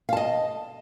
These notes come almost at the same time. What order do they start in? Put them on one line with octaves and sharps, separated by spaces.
F5 A5 D#5